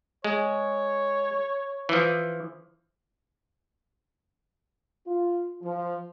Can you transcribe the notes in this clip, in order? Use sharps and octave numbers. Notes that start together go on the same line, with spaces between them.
G#3 C#5
E3 F3
F4
F3